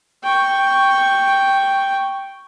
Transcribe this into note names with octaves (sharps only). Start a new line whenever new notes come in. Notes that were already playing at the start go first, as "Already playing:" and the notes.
G5 C#6